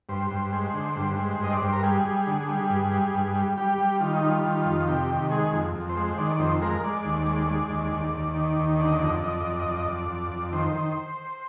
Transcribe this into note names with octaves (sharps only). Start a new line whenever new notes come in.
G2 C5
G2
G#3
D3
G2
G#3
G2 D#5
D5
G2 C5
A#4
G3 G#4
G3
D3
G3
G2
G3
G2
G3
G3 G4
G3
D#3 F4
D#4
G3 F4
D#3 F4
F2
C3 G4
D#3
G#3 G#4
F2
F2
C5
G#3
D#3 D5
D5
F2 C5
G#3 A#4
G#3 D5
D#2
G#3
G#3
D#2
D#2
D#2
D#3
D#2
D3 D5
D#5
D5
F2
D#5
D5
F2 D#5
D5
F2 D#5
D5
D#5
F2 D5
D#5
F2 D5
F2
F2
D#3 C5
D#3